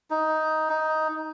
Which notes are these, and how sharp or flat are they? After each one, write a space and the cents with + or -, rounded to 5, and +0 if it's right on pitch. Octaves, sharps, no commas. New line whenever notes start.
D#4 +10
D#4 +10